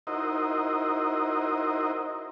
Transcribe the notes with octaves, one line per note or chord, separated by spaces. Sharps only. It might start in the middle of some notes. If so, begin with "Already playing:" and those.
D#4 E4 F#4 A#4 C5 D#5